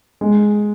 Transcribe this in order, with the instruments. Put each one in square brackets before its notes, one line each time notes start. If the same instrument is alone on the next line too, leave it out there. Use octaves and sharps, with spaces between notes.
[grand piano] G#3